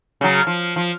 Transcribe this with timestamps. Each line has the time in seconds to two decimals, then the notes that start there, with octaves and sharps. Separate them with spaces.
0.21 C#3 F#3
0.47 F3
0.76 F3